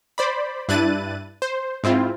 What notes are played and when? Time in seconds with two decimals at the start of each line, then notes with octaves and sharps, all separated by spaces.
0.18 C5 D5 B5
0.69 G2 D4 E4 F#6 A6 D#7
1.42 C5
1.84 G#2 C4 E4 F4